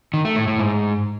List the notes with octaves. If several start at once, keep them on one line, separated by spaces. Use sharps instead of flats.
D#3
A3
A2
A2
G#2